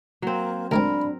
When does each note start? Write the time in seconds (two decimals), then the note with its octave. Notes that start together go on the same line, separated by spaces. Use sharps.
0.22 F#3 A#3 C4
0.71 D2 G#3 C4 D4 A#4 B5